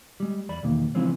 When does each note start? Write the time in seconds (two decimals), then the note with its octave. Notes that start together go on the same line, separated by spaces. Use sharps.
0.20 G3 G#3
0.49 E2 D5 B5
0.63 B1 E2 D#3 A#3
0.95 C#3 E3 F3 G#3 C4 C#4